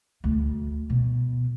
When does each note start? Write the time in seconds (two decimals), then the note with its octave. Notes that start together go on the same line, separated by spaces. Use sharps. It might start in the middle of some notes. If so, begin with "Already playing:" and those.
0.24 D2
0.90 B2